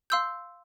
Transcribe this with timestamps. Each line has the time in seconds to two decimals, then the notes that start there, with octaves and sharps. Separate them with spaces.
0.10 F5 C6 E6 G6